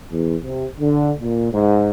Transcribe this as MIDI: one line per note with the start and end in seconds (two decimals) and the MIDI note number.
0.12 0.37 40
0.44 0.65 48
0.79 1.12 50
1.19 1.51 46
1.53 1.91 44